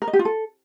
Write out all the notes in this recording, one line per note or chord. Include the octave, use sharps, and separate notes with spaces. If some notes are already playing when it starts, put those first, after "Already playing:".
A#4
D#5
G4
F4
A4